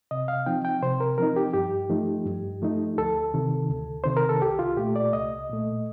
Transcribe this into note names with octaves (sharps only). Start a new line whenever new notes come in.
C3 D#5
F5
F3 C4 D#4 G5
G5
C3 C5
A#4
F3 C4 D#4 A#4
G4
G2 G4
F3 A3 D#4
G2
F3 A3 D#4
D2 A4
C3 D#3
D2
C3 D#3 C5
A#4
A4
C2 G4
F4
A#2 A3 G4
D5
C2 D#5
A#2 A3